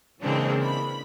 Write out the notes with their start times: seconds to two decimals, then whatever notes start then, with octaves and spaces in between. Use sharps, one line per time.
0.22 C#3 E3 G#3 A#3 C4 D4
0.63 B5